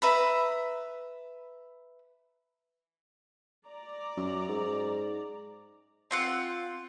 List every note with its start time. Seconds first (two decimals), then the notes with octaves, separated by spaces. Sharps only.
0.02 B4 E5 A#5 B5
3.67 D5 A#5
4.17 F#2
4.48 G#2
6.11 C4 F4 F#5